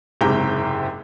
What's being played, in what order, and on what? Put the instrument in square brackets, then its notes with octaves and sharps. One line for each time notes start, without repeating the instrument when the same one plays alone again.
[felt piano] F#1 G#2 C3 G4 G5 A#5